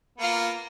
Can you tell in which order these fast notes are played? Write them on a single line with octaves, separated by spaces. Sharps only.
B3 A#3 F4